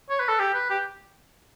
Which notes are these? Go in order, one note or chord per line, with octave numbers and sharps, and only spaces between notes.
C#5
B4
A4
G4
B4
G4